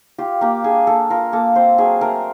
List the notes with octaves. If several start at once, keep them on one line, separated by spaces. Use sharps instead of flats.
F4 G4
A#3 G4
D4 G#4
A#3 A4
F4 A#4
A#3 A4
C4 C5
F#3 G#4
A3 A#4